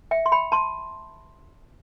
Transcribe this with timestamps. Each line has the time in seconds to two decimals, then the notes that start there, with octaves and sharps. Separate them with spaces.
0.11 E5 G5
0.26 C6
0.32 G5 B5
0.52 A5 C6